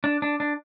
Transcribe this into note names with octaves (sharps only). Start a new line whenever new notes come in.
D4
D4
D4